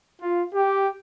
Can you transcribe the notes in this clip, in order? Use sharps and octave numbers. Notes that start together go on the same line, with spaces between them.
F4
G4